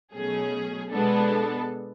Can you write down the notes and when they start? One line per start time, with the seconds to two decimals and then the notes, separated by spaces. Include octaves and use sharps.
0.14 B2 F#3 A3 C#4 G#4
0.91 B2 G#3 B3 D4 A4